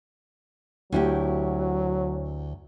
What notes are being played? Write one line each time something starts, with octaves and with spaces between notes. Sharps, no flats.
D2 F#3 E4 G4